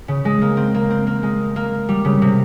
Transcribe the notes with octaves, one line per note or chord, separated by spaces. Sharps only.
C#3
G#3
A#3
C4
A#3
C4
A#3
G#3
A#3
G3
C#3
C3